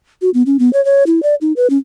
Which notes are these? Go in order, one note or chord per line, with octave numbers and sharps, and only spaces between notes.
F#4
B3
C#4
B3
C#5
C#5
E4
D5
D#4
B4
C#4